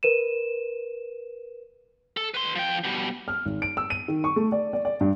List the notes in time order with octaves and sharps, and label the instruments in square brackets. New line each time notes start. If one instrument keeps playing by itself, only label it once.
[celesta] A#4 B4 D#7 E7
[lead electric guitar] A4
B4 C6
F3 G5
B2 G3
[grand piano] F6
G#1
D7
E6
D#7
D#3
C#6
A3
D5
D5
D5
G2